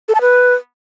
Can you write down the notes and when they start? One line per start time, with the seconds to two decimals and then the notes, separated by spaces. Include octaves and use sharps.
0.09 A4
0.15 A5
0.21 B4